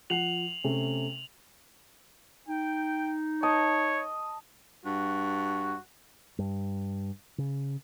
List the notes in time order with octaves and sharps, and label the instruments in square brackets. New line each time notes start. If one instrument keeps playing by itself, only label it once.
[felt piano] F3 F#5 C7 [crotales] F7 F#7
[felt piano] C3 A3 C#4
[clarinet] D#4 [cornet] G5
[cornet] C#5 [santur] D#5 A5
[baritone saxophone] G2 [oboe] F#4
[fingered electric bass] G2
C#3